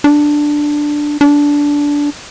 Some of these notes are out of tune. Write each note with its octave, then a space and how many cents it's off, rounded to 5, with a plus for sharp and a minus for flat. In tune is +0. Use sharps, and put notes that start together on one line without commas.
D4 +5
D4 -15